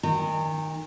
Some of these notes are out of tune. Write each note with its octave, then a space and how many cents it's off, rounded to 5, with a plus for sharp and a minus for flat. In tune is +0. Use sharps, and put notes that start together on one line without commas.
D#3 +0 G5 +45 A#5 -40